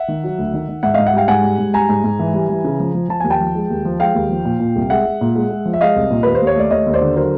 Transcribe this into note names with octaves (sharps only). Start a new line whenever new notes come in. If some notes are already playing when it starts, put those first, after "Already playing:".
Already playing: E5 F#5
D#3
F#3
D2
D#3
D#3
G#2 E5 F#5
G#2 D#5 F5
E5 F#5
G3 F5 G5
G#2 F#5 G#5
G3
G#2
G3 G#5 A#5
G#2
G#2
E3
G3
E3
C#3
F3
F3
F3 A5
D#2 G#5
G5 A5
F3
G#3
D#2
F3
G#3 F5 G5
D#2
F3
A#2
A#2
C2
G#3 E5 F#5
G#3
A#2
G#3
G#3
F3
E5
G#3 D#5 F5
C2
A#2
D#2 B4
C5
D#2
C#5
A3 D5
D#2 C#5 D#5
D#2
C5 D5
D3
F#3 A#4 C5